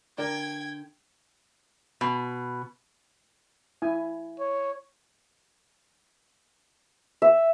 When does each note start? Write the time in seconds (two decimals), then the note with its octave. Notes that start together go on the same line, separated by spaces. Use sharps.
0.18 D3 A#4 D5 G5 G#6
2.01 B2
3.82 E4 G#5
4.40 C#5
7.22 E5